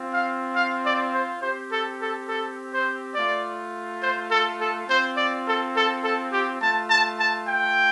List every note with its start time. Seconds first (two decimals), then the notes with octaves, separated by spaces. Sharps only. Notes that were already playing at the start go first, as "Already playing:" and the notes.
Already playing: C4 F4
0.13 F5
0.56 F5
0.85 D5
1.14 C5
1.42 C4 G4 C5
1.71 A4
2.01 A4
2.29 A4
2.73 C5
3.15 A3 F4 D5
4.03 C5
4.30 A4
4.60 A4
4.88 C4 F4 C5
5.17 D5
5.47 A4
5.75 A4
6.03 A4
6.32 G4
6.61 A3 F4 A5
6.90 A5
7.18 A5
7.48 G5